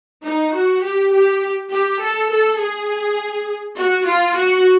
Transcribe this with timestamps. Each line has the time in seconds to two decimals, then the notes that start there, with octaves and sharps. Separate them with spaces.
0.23 D#4
0.53 F#4
0.82 G4
1.12 G4
1.71 G4
2.00 A4
2.30 A4
2.59 G#4
3.77 F#4
4.06 F4
4.36 F#4